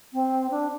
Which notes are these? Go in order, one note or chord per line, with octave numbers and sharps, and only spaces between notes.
C4
D4